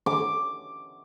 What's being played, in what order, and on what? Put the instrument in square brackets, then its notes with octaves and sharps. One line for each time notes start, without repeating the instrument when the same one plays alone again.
[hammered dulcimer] D6